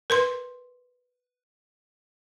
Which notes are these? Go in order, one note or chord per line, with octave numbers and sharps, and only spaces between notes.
A#4 B4 C6